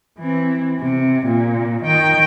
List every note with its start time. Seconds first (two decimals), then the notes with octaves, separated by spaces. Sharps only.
0.19 E3 C4
0.80 C3
1.26 A#2
1.83 D#3 G5